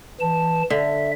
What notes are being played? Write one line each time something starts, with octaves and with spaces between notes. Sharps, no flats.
E3 A5
D3 E5